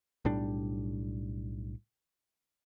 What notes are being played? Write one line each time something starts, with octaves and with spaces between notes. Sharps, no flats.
B1 A2 G3 D4